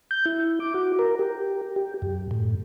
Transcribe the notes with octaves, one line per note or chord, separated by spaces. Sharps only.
G6
E4
D6
F#4
A#4
G4
G4
F#2
A2